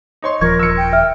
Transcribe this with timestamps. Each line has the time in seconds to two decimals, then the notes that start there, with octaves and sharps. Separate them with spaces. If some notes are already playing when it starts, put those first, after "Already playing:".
0.22 D#4 C#5 C6
0.41 D#1 F3 A#4 C#6 G#6
0.60 E6 C#7
0.77 G5
0.93 E5 F6